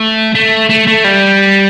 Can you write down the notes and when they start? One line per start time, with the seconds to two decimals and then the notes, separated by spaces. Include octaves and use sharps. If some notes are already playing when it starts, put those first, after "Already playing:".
Already playing: A3
0.35 A3
0.69 A3
0.87 A3
1.04 G3